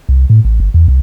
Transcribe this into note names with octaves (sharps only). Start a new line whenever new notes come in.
C2
A2
A1
G1
E2
C2